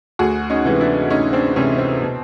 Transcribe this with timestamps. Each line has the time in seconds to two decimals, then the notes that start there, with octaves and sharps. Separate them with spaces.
0.19 D2 F#4 G#4
0.50 C#4 D#4
0.65 C3 E3 G#3 B3
0.80 D4 E4
1.10 D2 C#4 D#4
1.33 C4 D4
1.56 C3 E3 G#3 B3 C#4
1.78 C4
2.02 B2